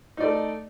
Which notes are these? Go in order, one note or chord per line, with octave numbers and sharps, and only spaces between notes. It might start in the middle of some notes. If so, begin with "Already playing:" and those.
A3 D#4 D5